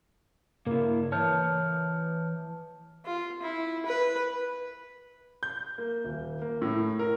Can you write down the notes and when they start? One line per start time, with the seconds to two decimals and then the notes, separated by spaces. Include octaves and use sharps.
0.66 G2 C#3 A#3 E4 A#4
1.12 E3 C#5 A5 F6 G6
3.05 F4
3.42 E4
3.86 B4
5.43 G6
5.78 A#3
6.04 D#1
6.42 A#3
6.62 A2
6.99 A#4